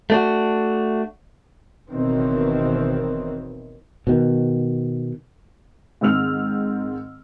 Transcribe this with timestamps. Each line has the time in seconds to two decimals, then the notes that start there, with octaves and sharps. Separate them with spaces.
0.10 A3 D4 F#4
1.89 F#1 B2 D#3 E3 C4
4.07 B2 D#3
6.01 G#2 D#3 C4 E6 F6 F7